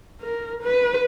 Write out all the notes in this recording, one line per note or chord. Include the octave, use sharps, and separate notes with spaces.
A#4
B4